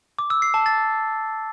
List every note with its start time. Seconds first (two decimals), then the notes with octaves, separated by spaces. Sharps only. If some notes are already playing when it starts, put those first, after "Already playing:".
0.19 D6
0.30 E6
0.42 C7
0.54 A5
0.66 A6